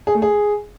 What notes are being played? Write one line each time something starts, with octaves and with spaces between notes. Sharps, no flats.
G#4
A3
G#4